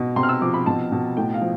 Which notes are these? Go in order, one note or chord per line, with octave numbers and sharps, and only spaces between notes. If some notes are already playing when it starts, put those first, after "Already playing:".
Already playing: B2
C3 C6
F6
E6
F3 D6
B5
B2 A5
B2
A2 G5
F5
F3